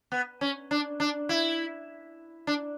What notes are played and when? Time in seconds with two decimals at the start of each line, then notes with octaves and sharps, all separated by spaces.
0.12 B3
0.41 C#4
0.71 D4
1.00 D4
1.29 E4
2.47 D4